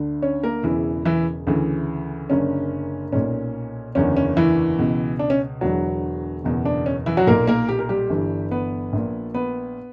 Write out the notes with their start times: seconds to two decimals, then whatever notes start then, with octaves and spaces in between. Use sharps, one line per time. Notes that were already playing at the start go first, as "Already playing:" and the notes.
Already playing: D2 D3
0.22 C#4 C#5
0.43 A#3 A#4
0.63 E1 E2 C#3 E3 E4
1.05 E3 E4
1.47 D2 C#3 E3
2.30 F#1 F#2 D3 C#4
3.12 B1 A#2 C#4
3.95 F#1 E2 D3 C#4
4.17 C#4
4.37 E3 E4
4.78 C#2 B2
5.19 D4
5.30 C#4
5.61 E1 E2 D3 F#3 F#4
6.44 F#1 E2 B2
6.65 D4
6.86 C#4
7.06 E3 E4
7.17 F#3 F#4
7.27 B1 A#2 A#3 A#4
7.47 A#3 A#4
7.69 G4
7.79 A#4
7.89 G3 G4
8.10 G1 G2 E3
8.51 B3 B4
8.93 A#1 A#2
9.34 B3 B4